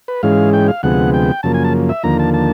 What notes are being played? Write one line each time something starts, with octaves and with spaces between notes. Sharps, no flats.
B4
G#2 E3 G#3 C#4 F5
G5
F5
D2 C3 F3 G#3 B3 F#5
G5
F#2 C#3 F3 A#3 A5
G#5
A5
E5
D#2 D3 F3 A#3 A#5
A5
A5